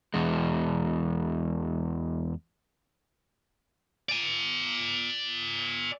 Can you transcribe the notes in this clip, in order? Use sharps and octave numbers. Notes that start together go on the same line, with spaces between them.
E2 G#3
D5 G#5